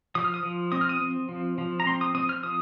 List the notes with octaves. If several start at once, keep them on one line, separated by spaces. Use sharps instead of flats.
F3 D#6
F6
D#6
F3
C4 D#6
F6
D#6
C4
F3
F3
A#5
C4 C6
D#6
C4 D#6
F6
F3 D#6